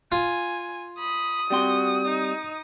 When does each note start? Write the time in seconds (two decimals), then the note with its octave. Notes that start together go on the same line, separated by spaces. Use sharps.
0.12 F4 G#5
0.99 B5 D#6
1.50 G3 C4 F#4 C6
2.05 D#4